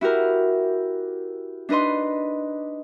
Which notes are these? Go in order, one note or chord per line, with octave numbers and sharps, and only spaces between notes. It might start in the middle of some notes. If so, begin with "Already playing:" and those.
E4 F#4 G4 A#4
D4 D#4 B4 D#5 C6